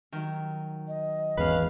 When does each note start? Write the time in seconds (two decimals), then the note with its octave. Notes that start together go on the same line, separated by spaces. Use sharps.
0.12 D#3 F#3
0.88 D#5
1.37 G#1 E2 G#3 C#4 B4 F5